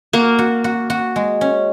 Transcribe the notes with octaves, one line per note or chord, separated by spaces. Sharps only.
A#3 F#4
F#4
F#4
F#4
G#3
C#4